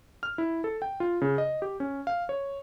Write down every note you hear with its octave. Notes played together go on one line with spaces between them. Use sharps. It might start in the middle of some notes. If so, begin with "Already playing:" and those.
F6
E4
A4
G5
F4
C#3
D#5
G4
C#4
F5
C#5